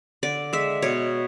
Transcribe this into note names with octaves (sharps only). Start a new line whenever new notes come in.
D3 D5
G#3 E5
B2 C#5